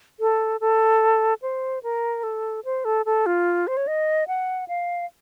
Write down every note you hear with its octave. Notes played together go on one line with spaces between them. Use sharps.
A4
A4
C5
A#4
A4
C5
A4
A4
F4
C5
C#5
D#5
F#5
F5